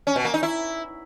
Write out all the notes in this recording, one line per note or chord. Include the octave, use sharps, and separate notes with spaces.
C#4
B2
A#3
D#4
E4